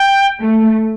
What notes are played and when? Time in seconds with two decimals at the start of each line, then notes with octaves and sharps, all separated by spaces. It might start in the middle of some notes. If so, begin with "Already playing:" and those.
Already playing: G5
0.39 A3